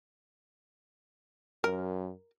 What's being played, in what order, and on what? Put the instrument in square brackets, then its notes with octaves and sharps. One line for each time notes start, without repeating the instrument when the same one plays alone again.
[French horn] F#2 [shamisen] A#4